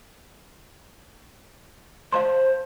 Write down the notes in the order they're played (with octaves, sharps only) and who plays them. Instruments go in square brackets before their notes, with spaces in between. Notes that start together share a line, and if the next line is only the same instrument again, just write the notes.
[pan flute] C5 [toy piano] F5 A5 C6